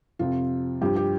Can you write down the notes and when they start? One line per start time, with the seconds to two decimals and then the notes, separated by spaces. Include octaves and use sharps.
0.19 F2 C3 F3 F4
0.81 G2 F3 G4
0.96 G4